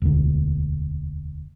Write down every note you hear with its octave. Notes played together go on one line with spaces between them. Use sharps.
E1 D2